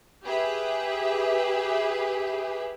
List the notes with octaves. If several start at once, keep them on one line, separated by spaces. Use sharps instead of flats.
G4 G#4 B4 E5